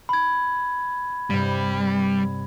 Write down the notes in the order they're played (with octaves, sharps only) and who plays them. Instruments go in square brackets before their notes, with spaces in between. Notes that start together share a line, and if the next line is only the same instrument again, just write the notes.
[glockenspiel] B5 G#6
[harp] G2 C3 [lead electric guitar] G3